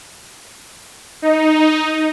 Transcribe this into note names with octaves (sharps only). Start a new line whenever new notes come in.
D#4